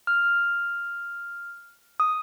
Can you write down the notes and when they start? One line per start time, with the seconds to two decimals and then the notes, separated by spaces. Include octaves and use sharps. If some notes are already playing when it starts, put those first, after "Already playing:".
0.07 F6
2.00 D#6